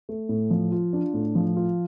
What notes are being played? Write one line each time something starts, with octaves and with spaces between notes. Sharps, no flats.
A3
A2
F3
F4
D4
A2
F3
F4